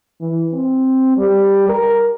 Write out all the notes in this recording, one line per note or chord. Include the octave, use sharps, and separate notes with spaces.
E3
C4
G3
A#4